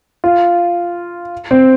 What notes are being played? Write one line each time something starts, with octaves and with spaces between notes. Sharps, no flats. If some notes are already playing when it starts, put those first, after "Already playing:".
F4
C4